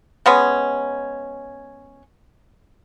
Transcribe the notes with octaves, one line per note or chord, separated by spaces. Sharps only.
G#3 B3 C#4